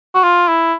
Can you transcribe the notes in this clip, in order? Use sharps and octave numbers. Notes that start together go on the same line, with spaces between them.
F#4
F4
E4